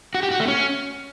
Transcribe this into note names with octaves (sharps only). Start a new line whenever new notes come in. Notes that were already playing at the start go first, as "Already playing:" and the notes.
F#4
G4
F#4
A3
C#4